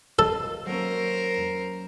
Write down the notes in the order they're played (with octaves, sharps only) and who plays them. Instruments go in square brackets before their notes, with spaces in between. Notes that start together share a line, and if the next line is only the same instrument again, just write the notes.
[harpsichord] A4 [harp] D#5 F5
[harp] F#3 A#3 C#4 [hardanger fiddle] A#4 C5